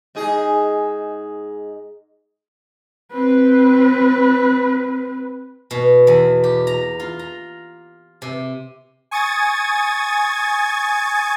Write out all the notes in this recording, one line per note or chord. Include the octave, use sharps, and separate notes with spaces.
G#2 D#4 G#4
C4 B4
B2
E2
G4
A#5
F4
A#5
C3
G#5 C#6 D#6 G#6 A6